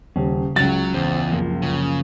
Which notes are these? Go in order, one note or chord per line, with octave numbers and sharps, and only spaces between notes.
D#1 C#3
C#2 F#3 A6
E2 C5
F#2 F3 A#3
C#3